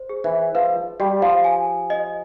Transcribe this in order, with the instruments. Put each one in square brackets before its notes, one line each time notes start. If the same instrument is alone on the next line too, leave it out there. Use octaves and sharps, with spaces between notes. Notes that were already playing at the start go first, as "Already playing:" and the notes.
Already playing: [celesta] C5
G#4
[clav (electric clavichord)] E3
[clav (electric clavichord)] F3 [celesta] B4
[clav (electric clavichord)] G3 [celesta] G4
[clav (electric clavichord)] F3
[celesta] G#5
D#5